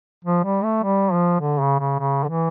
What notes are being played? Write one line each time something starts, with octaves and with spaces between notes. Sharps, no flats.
F3
G3
A3
G3
F3
D3
C#3
C#3
C#3
D3
E3